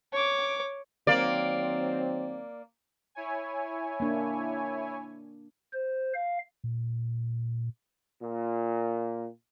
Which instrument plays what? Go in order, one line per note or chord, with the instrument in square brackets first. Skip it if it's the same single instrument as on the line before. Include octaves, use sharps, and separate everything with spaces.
[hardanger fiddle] C#5 D6
[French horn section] D#3 F#3 C4 [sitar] A#3 D5
[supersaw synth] E4 C#5 G#5
[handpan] A#3 D4
[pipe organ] C5
F5
[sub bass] A#2
[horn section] A#2